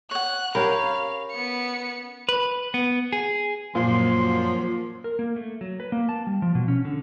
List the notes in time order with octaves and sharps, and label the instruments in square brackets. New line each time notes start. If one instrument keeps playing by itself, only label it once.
[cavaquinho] C#5 F#5 [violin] F#6
[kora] C#4 G4 A#4 [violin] F5 [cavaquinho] B5
[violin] B3 C#7
[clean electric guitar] B4
B3
G#4
[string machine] F#2 F#3 [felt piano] A#2 [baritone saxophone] F3 [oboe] C6
[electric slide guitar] A#4
A#3
A3
F#3
B4
A#3
A5
G3
F3
B2
C#4
D3